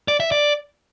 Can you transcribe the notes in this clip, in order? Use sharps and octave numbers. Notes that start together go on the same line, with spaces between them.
D5
E5
D5